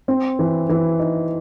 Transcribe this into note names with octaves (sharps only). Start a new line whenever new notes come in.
C4
E3
E3
D#4